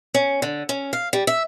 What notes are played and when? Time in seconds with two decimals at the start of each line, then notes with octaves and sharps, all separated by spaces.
0.14 C#4
0.42 D3
0.69 C#4
0.93 F5
1.13 G3
1.27 E5